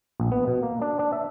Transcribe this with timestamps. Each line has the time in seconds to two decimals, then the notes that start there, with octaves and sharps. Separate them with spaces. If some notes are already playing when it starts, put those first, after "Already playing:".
0.20 A#1
0.32 B3
0.47 B2
0.63 A#3
0.82 D4
0.99 D4
1.12 E5